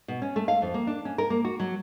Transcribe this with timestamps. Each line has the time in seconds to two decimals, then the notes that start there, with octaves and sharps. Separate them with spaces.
0.08 B2
0.22 C#4
0.36 A3
0.48 F5
0.62 F2
0.74 A#3
0.87 D4
1.05 C#4
1.18 A#4
1.30 A#3
1.45 F#4
1.60 F#3